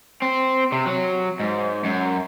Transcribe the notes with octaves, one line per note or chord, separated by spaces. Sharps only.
C4
C3
F#3
G#2
F#2